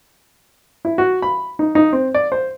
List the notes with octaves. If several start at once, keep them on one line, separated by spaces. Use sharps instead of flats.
E4
F#4
B5
D#4
D#4
C4
D5
C5